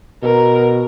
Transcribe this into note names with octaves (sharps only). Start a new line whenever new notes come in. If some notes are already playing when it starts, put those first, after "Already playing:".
B2 A#4